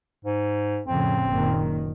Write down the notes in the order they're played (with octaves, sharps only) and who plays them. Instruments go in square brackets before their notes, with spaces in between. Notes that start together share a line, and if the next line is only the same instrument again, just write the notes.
[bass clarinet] G#2
[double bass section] F2 A2 C#3 [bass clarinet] C4
[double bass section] F#1 A#2 D#3